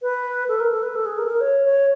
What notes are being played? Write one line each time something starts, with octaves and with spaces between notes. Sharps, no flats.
B4
A4
A#4
A4
B4
A4
G#4
A#4
A4
A#4
C#5
C#5